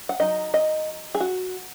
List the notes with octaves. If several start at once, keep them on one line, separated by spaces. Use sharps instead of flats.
F#5
F#3 D#4 D#5
D#5
G#4
F#4